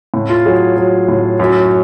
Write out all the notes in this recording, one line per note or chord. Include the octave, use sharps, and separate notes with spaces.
A2
F4
F#3 G#4
F#3
A2
F#2